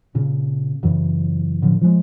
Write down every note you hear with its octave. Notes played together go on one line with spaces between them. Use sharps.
A#2 C#3
F#1 F#2 C#3 E3
A2 D3 F3
F3 G#3